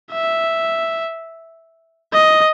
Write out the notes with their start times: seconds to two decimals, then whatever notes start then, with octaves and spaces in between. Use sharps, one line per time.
0.12 E5
2.13 D#5